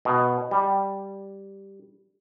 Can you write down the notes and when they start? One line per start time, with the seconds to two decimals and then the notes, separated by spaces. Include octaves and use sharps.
0.05 B2
0.51 G3